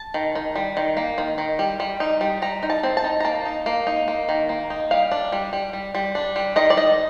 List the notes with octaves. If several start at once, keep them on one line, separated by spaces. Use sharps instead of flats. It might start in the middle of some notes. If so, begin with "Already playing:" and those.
Already playing: A5
D#3
D#3
G3
D#3
A#3
D#3
D#3
G3
G3
D#4
G3
G3 A#5
D#4
A5
C4
A5
D#4
A#5
A#3 A5
D#4
A#3
D#4
A#3
D#3
A#3
D#4
G3 F5
D4
G3
G3
G3
G3
D4
G3
D#3 D#5
D5
D#3 D#5